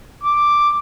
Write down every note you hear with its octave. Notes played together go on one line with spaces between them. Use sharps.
D6